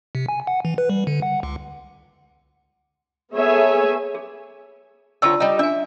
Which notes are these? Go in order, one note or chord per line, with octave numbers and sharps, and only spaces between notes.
C3
G#5
F#5
E3
B4
G3
D3
F#5
C#2
B3 G#4 A4 C#5 E5 G#5
G#4
D3 C4 F4 C#5 A5 E6
G3 D#4
D4 E5 G#5